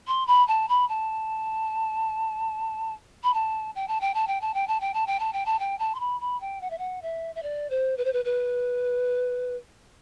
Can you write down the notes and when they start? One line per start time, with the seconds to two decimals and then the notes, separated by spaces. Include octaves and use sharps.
0.07 C6
0.27 B5
0.48 A5
0.69 B5
0.89 A5
3.23 B5
3.34 A5
3.75 G5
3.88 A5
4.01 G5
4.14 A5
4.27 G5
4.41 A5
4.54 G5
4.68 A5
4.81 G5
4.94 A5
5.07 G5
5.20 A5
5.33 G5
5.46 A5
5.59 G5
5.79 A5
5.95 C6
6.00 B5
6.21 B5
6.41 G5
6.61 F#5
6.70 E5
6.78 F#5
7.02 E5
7.35 E5
7.43 D5
7.70 C5
7.97 B4
8.05 C5
8.13 B4
8.25 B4